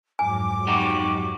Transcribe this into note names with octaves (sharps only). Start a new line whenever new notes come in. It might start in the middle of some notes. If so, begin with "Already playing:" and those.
F2 G#2 F#3 G#5 D6
D#4 F#4 G4